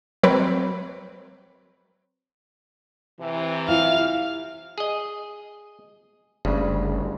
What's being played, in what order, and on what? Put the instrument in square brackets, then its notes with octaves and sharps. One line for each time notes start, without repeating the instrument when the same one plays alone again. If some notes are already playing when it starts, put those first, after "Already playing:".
[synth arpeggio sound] F#3 C4 A#4 B4 C#5
[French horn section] C3 E3
[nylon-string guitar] E4 F4 [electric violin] F5
[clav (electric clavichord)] G#4 D#5
[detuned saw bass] F#1 [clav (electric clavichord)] D2 G2 C#3